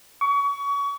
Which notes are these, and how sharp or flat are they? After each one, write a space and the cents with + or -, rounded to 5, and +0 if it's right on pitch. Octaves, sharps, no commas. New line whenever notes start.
C#6 +30